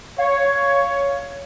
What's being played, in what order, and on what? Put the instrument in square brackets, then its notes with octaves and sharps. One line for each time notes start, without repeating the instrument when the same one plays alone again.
[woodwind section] C#5 [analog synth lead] F5